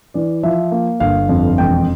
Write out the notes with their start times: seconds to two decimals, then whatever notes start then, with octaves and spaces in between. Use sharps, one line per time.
0.14 E3 D5
0.43 F3 E5
0.72 A#3
1.00 G1 F5
1.29 F2
1.58 E1 G5